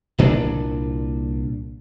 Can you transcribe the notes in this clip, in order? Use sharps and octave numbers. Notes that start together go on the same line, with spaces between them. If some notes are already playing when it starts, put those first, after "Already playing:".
C2 A#2 D4